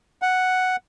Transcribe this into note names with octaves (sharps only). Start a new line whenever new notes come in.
F#5